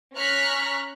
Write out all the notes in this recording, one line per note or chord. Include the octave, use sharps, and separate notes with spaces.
C#4 A#5 C#6 F6 F#6 B6